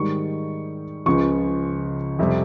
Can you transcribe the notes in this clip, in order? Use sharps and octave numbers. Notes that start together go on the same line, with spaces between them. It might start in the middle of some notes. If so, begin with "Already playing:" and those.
Already playing: G#2 D#3 G3 C#6
C#2 C#3 F3 C#6
F2 C3 G3